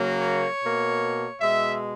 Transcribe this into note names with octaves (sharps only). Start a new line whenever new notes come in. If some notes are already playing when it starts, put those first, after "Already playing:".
Already playing: C#3 F#3 A#3
C#5
B2 A#3
B2 G#3 E5